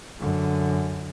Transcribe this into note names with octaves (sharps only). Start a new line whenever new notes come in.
F#2 D3